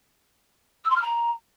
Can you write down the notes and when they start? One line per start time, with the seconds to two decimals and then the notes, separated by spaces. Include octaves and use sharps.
0.84 E6
0.90 C6
0.95 F6
1.01 A#5